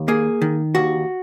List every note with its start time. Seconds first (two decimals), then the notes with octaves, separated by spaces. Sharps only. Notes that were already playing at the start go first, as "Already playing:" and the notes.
Already playing: D#2
0.08 A#3 G#4
0.41 D#3
0.75 D#2 F#4